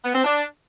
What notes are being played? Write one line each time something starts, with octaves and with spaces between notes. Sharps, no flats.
B3
C4
D4